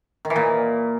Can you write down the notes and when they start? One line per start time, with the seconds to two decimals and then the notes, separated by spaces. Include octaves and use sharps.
0.25 D#3
0.30 E3
0.36 A#2